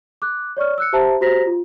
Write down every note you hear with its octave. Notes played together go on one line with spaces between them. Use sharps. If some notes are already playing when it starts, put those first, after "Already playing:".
D6 F#6
C#5 D5 C#6 F6
E6 F#6 C#7
G4 C5 E5 A5 A#5
F#4 G4 C5 A#5 A#6 B6
F4